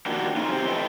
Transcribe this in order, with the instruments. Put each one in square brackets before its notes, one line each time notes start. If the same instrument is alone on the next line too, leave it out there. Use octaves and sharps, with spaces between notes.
[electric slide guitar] D#3 F3 A#3 D4 F#4 G4
F2 C#3 D#4 F4
G2 E3 C4 G4 C5 G5
C3 F4 A4 B4 D#5 G5